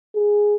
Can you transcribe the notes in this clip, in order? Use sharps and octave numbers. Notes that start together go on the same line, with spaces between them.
G#4